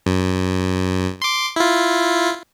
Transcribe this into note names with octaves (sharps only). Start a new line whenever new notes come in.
F#2
C6 D6
E4 F4